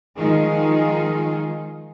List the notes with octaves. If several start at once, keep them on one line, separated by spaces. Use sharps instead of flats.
D#3 F3 G#3 D#4 F4 G#4